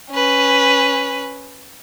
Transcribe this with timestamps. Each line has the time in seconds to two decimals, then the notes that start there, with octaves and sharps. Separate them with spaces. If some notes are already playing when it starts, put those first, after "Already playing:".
0.11 C#4 B4